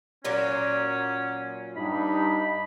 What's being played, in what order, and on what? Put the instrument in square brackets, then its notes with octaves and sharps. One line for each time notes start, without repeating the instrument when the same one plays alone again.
[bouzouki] A#2 F#3 A#3 [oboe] C#4
[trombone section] G2 D#4 [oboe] B5